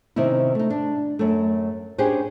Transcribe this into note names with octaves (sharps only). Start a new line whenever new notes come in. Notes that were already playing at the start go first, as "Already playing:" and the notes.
C3 D#3 C#4 D#4 E4
A3 D#4
D4
F#2 A3
C#4 D4 G4 G#4 B4 C5